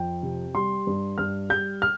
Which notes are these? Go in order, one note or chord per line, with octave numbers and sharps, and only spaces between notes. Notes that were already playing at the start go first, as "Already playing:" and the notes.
Already playing: F2 G5
C3
G3 C6
G2
G2 F6
G3 G6
F6